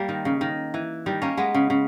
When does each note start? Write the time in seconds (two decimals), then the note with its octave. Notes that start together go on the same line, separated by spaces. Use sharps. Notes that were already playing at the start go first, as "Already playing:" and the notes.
Already playing: G3 A#3
0.09 D#3
0.25 C#3
0.41 D#3
0.74 E3
1.06 D#3 G3
1.22 A#3 C#4
1.37 G#3 B3
1.54 C#3
1.70 C#3